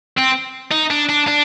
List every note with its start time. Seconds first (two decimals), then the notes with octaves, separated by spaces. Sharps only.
0.17 C4
0.72 D#4
0.91 D4
1.09 D4
1.28 D4